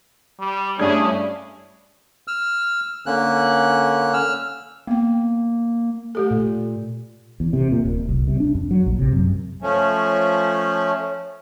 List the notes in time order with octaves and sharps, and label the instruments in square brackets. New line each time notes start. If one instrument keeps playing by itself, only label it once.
[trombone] G3
[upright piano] G2 A3 G#6 [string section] C#4 E4 [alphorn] D4 [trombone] G#4
[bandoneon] E6 F6
D3 A#3 C#4 F#6
E6 F6
[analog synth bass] A#3 [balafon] B3 G5
[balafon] A3 G4 A4
[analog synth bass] A#2
[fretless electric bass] E2
C3
A#2
D#1
C2
C3
D4
F2
F#3
A#1
C3
F#2
[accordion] F3 A3 C#4